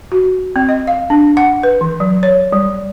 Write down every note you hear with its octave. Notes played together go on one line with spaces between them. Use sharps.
F#4
C4
D#5
F5
D4
F#5
B4
E3
F#3
C#5
G3